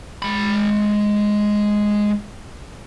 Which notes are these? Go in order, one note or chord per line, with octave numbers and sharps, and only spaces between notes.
G#3 B5